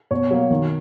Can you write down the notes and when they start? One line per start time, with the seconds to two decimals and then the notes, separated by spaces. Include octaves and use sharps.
0.11 B2 C#5
0.31 F#3 A#3
0.51 D#3